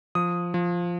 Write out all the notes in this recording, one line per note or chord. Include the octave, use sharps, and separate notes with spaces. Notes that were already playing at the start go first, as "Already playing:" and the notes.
F3 D#6
F3